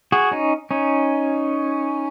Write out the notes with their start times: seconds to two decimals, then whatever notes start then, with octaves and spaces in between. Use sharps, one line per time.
0.12 F#4 G#4
0.31 C#4 D#4
0.71 C#4 D#4